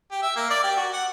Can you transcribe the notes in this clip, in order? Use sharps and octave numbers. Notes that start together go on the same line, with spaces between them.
G4
E5
A#3
D5
G4
F#4
F#5